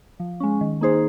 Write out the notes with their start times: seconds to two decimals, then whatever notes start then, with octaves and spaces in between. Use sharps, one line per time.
0.20 F3
0.40 G#3 C#4
0.61 D#3
0.81 A#3 D#4 G#4 C5